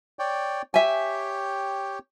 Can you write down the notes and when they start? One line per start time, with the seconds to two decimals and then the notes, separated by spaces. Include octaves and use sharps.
0.19 C#5 D5 G5
0.74 G4 C#5 E5 G5 G#5